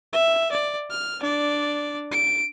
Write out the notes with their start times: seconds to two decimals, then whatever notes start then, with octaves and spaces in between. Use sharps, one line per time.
0.13 E5
0.52 D5
0.90 F6
1.21 D4 D5
2.12 D7